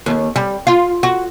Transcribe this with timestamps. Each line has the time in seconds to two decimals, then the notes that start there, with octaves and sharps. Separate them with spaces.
0.06 D#2
0.36 G3
0.67 F4
1.03 F#4